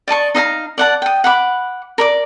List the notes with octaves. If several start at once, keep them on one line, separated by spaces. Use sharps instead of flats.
D5 D#5 A5 C#6
D#4 D#5 F5 A#5
D5 F#5 A5
G5 D#6
F#5 B5 D6
A#4 D5 D6